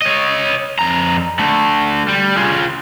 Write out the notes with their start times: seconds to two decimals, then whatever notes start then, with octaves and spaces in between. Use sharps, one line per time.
0.02 C#5 D#5
0.79 F2 A#5
1.39 D3 A3
2.08 G3
2.37 F4 G#4